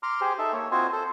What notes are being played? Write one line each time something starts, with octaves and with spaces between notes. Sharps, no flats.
A#5 C6 D6 F6
G4 G#4 C5
D#4 A4 E5
A#3 C#5
C4 F4 F#4 C5 D#5 G#5
A4 C5